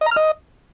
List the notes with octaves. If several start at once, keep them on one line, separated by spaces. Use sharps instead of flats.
D#5
A#5
F6
D#5